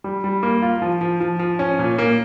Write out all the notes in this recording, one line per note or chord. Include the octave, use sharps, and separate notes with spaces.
G3
G3
A#3
F4
F3
F3
F3
F3
C#4
A#2
A#3